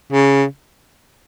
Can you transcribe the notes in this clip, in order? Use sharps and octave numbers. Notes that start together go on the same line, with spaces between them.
C#3